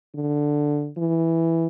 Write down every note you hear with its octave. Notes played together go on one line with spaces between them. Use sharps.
D3
E3